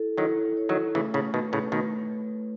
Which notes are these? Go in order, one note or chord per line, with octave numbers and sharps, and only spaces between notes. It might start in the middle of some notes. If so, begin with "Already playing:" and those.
Already playing: E4 A4
D#3 F#3 E4
C#5
D#3 F#3
C#3 E3 A3
A2 C#3
B2 D#3 B4
A2 C#3
B2 D#3 A3